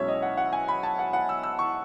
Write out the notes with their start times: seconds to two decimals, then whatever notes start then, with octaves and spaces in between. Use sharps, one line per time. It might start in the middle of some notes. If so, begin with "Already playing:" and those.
Already playing: B1 B2 G#3 C#4 E4 C#5 E5
0.08 D#5
0.22 F#5
0.37 F#5
0.53 G#5
0.68 B5
0.83 A5
0.99 F#5
1.13 F#5
1.29 E6
1.43 E6
1.59 C#6